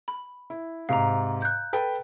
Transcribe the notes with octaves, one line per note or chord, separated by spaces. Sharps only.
B5
E4
G#2 C3 F5 A#5
F#6 G6
A4 B4 G5